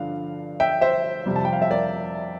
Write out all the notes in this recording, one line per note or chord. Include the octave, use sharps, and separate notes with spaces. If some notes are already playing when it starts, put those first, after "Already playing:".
Already playing: G2 D3 F3 F5
E5 G5
C5 E5
F2 C3 G3
A5
G5
F5
E5
A#4 D5